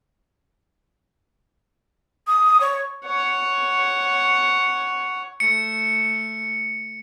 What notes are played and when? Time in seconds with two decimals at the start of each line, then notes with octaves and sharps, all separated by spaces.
2.27 D#6
2.60 C#5
3.06 C#5 F#5
5.40 A3 C#7